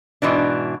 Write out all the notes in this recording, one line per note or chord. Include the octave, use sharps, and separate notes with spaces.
G#2 B2 E3 D4